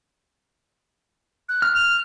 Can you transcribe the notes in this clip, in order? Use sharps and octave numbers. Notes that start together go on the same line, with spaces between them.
F#6
F6
F7